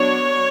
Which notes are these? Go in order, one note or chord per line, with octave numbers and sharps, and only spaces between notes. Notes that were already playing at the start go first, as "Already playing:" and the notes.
Already playing: F#3 B3 D4 C#5